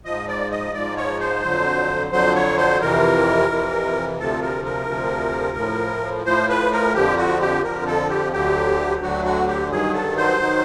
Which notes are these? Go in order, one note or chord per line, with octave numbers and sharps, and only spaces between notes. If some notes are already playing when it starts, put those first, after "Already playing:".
G#2 F3 D#5
D5
D#5
G#2 F3 D5
C#5
C5
F2 D3 F#3
F2 D3 F#3 C5
C#5
C5
F2 C3 E3 A#4
F2 C3 E3
D2 C3 F3 A4
A#4
A#4
D2 C3 F3
A2 F3
A2 F3 C5
B4
A#4
F2 D3 F3 G4
F#4
G4
F2 D3 F3 A#4
A4
G4
D2 D3 F#3 G4
D2 D3 F#3 F#4
F#4
G4
G2 D#3 F#3 G#4
A4
C5
D#3 F#3